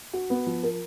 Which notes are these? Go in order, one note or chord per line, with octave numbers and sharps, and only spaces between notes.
F#4
B3
F3
A#4